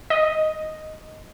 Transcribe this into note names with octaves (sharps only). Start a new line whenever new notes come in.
D#5